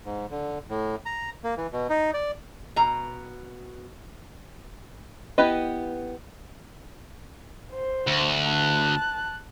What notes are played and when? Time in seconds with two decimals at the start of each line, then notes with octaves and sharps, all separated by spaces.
0.05 G#2
0.30 D3
0.69 A2
1.06 A#5
1.44 A#3
1.57 E3
1.72 B2
1.89 D#4
2.14 D5
2.76 B2 A#5
5.38 B3 E4 G4 B4 D#5
7.72 C5
8.07 D2
8.44 A5 F#6